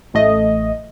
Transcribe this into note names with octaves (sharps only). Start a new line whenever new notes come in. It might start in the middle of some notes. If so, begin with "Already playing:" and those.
A1 A3 D#5